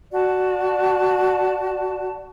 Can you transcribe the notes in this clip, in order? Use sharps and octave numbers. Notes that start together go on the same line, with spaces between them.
F#4 D5 A5